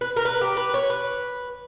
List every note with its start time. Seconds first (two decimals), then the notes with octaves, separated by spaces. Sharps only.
0.01 B4
0.16 A#4
0.25 B4
0.41 G4
0.57 B4
0.74 C#5
0.90 B4